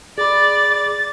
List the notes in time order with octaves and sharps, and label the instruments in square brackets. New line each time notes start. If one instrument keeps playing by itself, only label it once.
[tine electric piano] G#4 B5 [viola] D5 [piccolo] A6